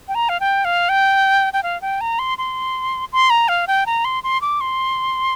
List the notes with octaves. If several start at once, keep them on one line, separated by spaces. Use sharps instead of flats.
G5
A#5
F5
G5
F5
G5
G5
F5
G5
A#5
C6
C6
C6
A#5
F5
G5
A#5
C6
C6
D6
C6